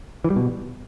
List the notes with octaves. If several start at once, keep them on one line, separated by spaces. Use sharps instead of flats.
E3
G3
B2